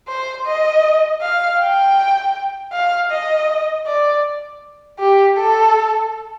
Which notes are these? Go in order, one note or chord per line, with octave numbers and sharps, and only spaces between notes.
C5
D#5
F5
G5
F5
D#5
D5
G4
A4